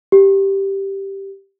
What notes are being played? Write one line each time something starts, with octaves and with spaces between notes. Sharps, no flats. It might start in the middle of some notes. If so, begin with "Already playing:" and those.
G4